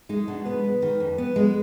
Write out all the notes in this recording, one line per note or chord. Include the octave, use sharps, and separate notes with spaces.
G#3 D#4
B2 D4
B3 B4
G#3
D#3
F2
B3
G#3